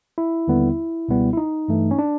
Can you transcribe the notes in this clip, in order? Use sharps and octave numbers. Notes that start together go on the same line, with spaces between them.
E4
D#2 D3 G3 B3
C#2 B2 G3 B3
E4
D#4
G2 E3 A3
C#4
D4